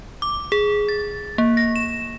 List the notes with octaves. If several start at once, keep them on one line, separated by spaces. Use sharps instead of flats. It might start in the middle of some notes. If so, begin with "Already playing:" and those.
D6
G#4
A6
A#3
A#6
E7